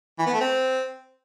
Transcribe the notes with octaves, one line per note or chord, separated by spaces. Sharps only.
E3
B3
A3
C4